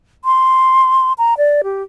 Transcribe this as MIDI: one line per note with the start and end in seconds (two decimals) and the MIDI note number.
0.25 1.13 84
1.18 1.34 82
1.37 1.61 74
1.64 1.83 67